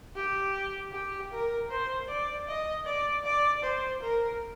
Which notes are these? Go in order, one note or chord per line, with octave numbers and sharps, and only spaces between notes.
G4
G4
A#4
C5
D5
D#5
D5
D5
C5
A#4